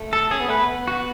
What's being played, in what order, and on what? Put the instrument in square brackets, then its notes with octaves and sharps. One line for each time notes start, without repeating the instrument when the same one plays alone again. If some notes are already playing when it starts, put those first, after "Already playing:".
Already playing: [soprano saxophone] A3
[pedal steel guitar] A4
[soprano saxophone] C#4 [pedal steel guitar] G#4
[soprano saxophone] B3
[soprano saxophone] A3 [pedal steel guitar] B4
[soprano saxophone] B3
[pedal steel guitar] F#4